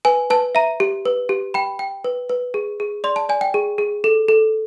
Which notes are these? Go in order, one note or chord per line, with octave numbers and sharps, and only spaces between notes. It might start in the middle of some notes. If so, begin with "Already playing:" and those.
B4 G#5
B4 A5
E5 A#5
G4
B4
G4
G5 B5
G5
B4
B4
G#4
G#4
D5 C6
A5
D5 G#5
G5
G#4
G#4
A4
A4